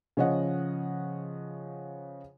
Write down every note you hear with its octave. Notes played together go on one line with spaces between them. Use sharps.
C#3 F3 C#5 D#5 F#5